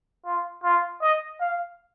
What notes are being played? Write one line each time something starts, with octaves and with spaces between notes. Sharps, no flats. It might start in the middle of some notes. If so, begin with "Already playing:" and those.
F4
F4
D#5
F5